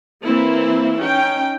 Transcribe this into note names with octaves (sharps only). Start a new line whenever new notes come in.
E3 A#3 C4 E4
C#4 D#4 G5